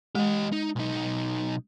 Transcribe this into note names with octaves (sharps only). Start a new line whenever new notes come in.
G#3 G4 D#5
D#4
B1 D#4